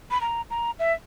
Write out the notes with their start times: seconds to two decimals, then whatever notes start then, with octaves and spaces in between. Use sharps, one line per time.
0.11 B5
0.21 A#5
0.50 A#5
0.79 E5